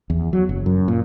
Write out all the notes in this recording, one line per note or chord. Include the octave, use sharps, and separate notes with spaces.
E2
F#3
F#1
F#2
A#2